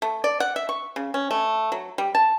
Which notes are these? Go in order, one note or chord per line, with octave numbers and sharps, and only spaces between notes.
A3
D5
F#5
E5
C#6
C#3
C#4
A3
F#3
G3
A5